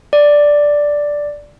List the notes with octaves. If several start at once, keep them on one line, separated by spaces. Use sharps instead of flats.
D5